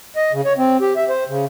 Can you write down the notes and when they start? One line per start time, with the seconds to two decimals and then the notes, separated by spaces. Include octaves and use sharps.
0.16 D#5
0.33 C#3
0.45 C#5
0.58 C4
0.81 G4
0.96 E5
1.09 C5
1.29 C#3